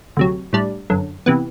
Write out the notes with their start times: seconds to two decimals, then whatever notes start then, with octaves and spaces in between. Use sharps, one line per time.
0.17 D2 C3 F#3
0.53 A2 G3 D4
0.90 G1 F#2 D3
1.26 C3 E3 B3